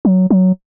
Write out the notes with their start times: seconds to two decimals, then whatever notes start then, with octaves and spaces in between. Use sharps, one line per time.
0.05 F#3
0.30 F#3